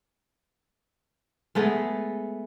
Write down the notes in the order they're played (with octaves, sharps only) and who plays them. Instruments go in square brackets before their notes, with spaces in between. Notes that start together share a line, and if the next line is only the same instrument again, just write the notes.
[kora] G#3 A3 B3